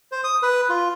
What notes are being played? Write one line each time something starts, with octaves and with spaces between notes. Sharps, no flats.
C5
D#6
B4
F4